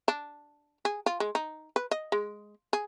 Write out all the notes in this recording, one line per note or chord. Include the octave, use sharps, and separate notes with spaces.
D4
G#4
F4
G#3
D#4
B4
D#5
G#3
G#4